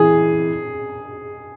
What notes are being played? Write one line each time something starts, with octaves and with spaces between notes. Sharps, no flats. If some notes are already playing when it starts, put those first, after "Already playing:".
Already playing: E3 G#4